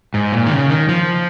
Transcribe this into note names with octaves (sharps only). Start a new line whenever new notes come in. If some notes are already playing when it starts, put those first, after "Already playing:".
G#2
A#2
D#3
C#3
D#3
F3